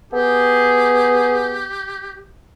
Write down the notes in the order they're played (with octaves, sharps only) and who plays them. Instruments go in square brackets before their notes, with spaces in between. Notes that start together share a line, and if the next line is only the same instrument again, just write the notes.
[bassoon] B3 [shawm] G4 [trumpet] G#4